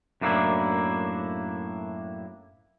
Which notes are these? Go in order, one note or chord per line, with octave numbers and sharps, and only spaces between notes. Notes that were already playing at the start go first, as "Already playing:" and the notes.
F#2 A2 A#3 B3 D4 E4